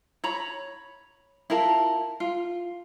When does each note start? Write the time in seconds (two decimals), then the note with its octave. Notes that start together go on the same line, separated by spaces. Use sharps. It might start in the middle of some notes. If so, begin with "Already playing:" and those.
0.24 C#5 A#5 B5
1.50 E4 F4 A#4 A5
2.20 F4